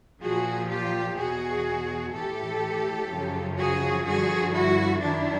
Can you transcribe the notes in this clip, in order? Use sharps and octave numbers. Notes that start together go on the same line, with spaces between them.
A#2 F3 F#4 G#4
F4 G4
E2 B2 F#4 G#4
A2 E3 G4 A4
F#2 C#3 F3
F#4 G#4
G2 D3 F3 F#4 G#4
E4 F#4
F#2 D#3 D4 E4